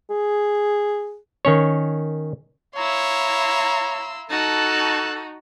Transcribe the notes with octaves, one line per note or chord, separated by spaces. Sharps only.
G#4
D#3 C#4 C#5
E4 C#5 F5 A#5 C6 E6
D#4 F#4 A4 A5 F#6